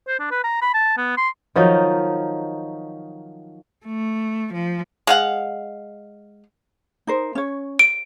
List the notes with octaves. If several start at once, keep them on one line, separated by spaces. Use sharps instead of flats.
C5
D4
B4
A#5
B5
A5
B3
C6
D#3 F3 F#3 D#4
A3
F3
G#3 F5 F#5
D#4 A#4 C5
C#4 C#5
D7